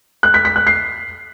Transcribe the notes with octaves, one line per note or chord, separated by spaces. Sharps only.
F#6
B6
B6
F#6
C7